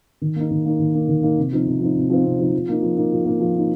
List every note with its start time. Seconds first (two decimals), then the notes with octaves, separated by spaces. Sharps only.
0.21 D#3
0.36 A#3 D#4
0.51 D#3
0.65 A#3 D#4
0.79 D#3
0.94 A#3 D#4
1.09 D#3
1.23 A#3 D#4
1.38 C3
1.52 F3 C4 D#4
1.67 C3
1.80 F3 C4 D#4
1.95 C3
2.10 F3 C4 D#4
2.24 C3
2.39 F3 C4 D#4
2.53 F3
2.68 A#3 D#4
2.82 F3
2.97 A#3 D#4
3.12 F3
3.25 A#3 D#4
3.40 F3
3.54 A#3 D#4